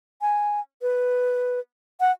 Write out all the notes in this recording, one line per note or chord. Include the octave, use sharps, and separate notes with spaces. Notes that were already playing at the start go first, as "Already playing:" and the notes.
G#5
B4
F#5